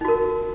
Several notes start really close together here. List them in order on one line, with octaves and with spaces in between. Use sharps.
D#4 F#4 A#4